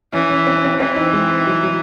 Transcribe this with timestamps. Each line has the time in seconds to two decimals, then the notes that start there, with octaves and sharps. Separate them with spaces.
0.13 E3 C#4
0.30 C#4
0.47 C4
0.56 C#4
0.65 C4
0.80 E3 C4
0.96 D#4
1.13 G#3
1.47 F#3
1.63 F#3